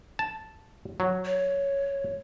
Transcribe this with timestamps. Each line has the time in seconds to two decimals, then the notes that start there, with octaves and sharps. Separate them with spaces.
0.19 A5
1.00 F#3
1.25 C#5